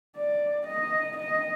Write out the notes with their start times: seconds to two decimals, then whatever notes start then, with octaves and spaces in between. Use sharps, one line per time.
0.17 D5
0.67 D#5
1.17 D#5